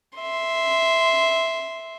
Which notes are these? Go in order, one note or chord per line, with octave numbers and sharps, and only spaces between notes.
E5 C6